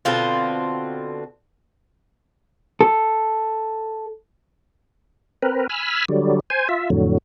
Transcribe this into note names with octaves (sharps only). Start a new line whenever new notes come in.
B2 D3 C4 F4
A4
C4 A#4 B4
G#5 B5 E6 F6
D3 F#3 G3
C5 G#5
F4 E5
F2 A2 D3 F#3